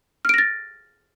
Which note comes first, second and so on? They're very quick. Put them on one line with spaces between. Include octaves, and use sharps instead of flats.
F6 D7 A#6 A6